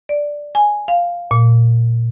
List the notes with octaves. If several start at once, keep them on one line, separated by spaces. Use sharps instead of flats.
D5
G#5
F5
A#2